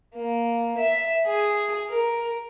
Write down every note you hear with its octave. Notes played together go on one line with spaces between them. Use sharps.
A#3
E5
G#4
A#4